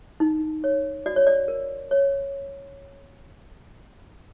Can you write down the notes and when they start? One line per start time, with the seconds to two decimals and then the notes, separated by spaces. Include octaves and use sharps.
0.20 D#4
0.64 C#5
1.06 F#4 D5
1.16 C#5
1.27 D5
1.48 A#4
1.91 C#5